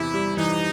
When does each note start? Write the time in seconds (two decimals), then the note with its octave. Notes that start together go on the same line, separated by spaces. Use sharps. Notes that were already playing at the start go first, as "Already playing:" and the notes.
Already playing: E2 C3 E3 E4
0.14 G3
0.37 E3 D#4